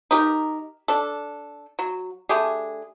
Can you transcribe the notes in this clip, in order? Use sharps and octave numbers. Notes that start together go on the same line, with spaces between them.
D#4 G4 A#4
D4 A4
F#3
D3 A3 G4 G#4